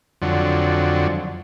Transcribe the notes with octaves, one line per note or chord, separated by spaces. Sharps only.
F2 D3 F#3